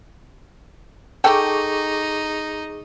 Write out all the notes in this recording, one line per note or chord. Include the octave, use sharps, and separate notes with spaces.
D#4 G#4 A4 G5 C#6 D6